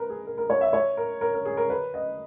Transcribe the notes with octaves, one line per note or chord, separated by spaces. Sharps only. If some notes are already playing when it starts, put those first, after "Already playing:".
Already playing: A#4 B4
G#4
A#4
A#4
C#5
E5
C#5
A#4
A#4
A#4
G#4
A#4
B4
D#5